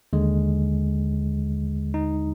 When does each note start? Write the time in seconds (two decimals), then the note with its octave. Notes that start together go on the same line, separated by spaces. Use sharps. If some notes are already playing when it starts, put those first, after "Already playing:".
0.13 D#2 D3 G#3
1.94 D#4